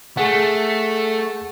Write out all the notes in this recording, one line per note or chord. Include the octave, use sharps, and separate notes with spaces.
A3 G#4 F#5